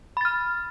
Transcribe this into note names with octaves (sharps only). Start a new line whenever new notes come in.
B5 F6 A6